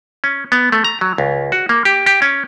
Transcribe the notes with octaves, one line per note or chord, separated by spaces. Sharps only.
C#4
B3
A3
A#5
F#3
C#2
F#4
A#3
G4
G4
C#4